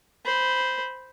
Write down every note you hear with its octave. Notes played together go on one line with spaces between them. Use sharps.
C5 B5